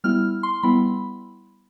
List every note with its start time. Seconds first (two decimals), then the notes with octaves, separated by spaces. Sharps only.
0.04 G3 B3 E4 F6
0.43 C6
0.63 G3 B3 E4 B5